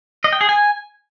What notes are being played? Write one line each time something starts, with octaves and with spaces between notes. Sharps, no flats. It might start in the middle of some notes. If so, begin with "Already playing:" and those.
D#5
G5
G#4
G#5